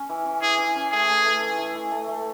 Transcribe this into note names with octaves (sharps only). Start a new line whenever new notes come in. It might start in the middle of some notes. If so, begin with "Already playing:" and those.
Already playing: C#4
E3
C#4
E3 G#4
E3
C#4
A3 G#4
A3
A3
E3
E3
E3
A3
A3